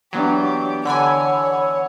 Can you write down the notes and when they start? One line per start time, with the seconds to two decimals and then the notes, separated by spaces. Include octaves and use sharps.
0.13 E3 F#3 B3 D4 G4
0.85 D3 C#5 F#5 G#5 B5 E6